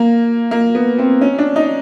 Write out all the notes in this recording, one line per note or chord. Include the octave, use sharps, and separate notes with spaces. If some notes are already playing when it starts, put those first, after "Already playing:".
Already playing: A#3
A#3
B3
C4
C#4
D4
D#4